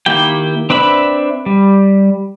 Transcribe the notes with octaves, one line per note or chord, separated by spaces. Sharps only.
D#3 A#3 E4 G4 G5
C4 D4 B4 E5 B5
G3